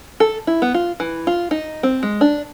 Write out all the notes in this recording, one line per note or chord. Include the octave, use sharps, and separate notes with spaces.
A4
E4
B3
F4
E3
F4
D#4
C4
G#3
D4